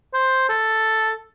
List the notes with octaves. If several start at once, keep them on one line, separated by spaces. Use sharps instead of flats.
C5
A4